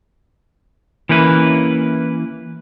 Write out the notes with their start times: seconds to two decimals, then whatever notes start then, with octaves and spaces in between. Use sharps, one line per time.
1.09 E3 A#3 C#4 E4 B4